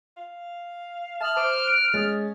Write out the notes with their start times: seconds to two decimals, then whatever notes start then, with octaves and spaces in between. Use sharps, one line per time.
0.17 F5
1.21 E5 A5 D#6 F6 F#7
1.36 C5 D6 D7
1.64 F#6 D7
1.94 G#3 C#4 D#6 A6